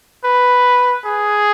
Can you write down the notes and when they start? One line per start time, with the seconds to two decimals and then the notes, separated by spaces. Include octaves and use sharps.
0.24 B4
1.05 G#4